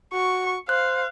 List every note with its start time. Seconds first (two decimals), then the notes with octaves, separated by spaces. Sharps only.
0.13 F#4 C#6
0.69 C5 F5 F#6